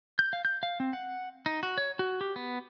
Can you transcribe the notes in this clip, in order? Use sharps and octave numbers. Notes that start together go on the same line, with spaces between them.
G6
F5
G6
F5
C4
F#5
D#4
F#4
C#5
F#4
G4
B3